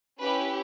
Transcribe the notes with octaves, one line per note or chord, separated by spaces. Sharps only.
C#4 E4 G4 B4